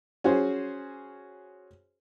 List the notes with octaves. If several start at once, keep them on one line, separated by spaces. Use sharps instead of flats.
C#4 F#4 G#4 C5